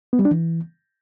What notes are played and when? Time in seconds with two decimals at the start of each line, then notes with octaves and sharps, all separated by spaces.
0.13 B3
0.19 G3
0.25 D4
0.31 E3